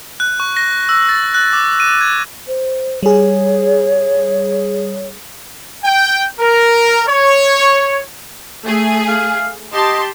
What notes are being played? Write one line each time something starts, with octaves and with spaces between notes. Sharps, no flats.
F#6
C#6
A#6
E6
A6
F#6
D6
D#7
G#6
C5
G3 G#4 C#5
G5
A#4
C#5
A3 G#4
F5
G4 D#5 A5 C6